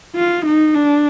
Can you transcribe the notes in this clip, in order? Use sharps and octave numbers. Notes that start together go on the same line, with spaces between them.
F4
D#4
D4